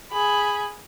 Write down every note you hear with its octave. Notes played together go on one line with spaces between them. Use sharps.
G#4 B5